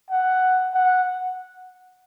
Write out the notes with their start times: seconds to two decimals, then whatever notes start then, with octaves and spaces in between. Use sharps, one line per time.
0.11 F#5
0.73 F#5